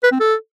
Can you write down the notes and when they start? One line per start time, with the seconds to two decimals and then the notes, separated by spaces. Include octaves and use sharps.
0.04 B4
0.12 C4
0.20 A4